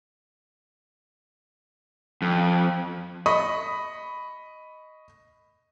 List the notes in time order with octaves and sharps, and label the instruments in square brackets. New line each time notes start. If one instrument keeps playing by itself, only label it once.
[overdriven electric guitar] F2
[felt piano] D#5 B5 C#6 D#6